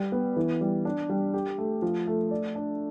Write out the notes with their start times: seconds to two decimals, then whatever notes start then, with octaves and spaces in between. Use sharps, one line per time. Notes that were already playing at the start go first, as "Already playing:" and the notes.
Already playing: G3
0.12 B3
0.37 E3
0.61 G3
0.85 D4
1.10 G3
1.34 G4
1.58 A3
1.82 F3
2.07 A3
2.31 D5
2.55 D4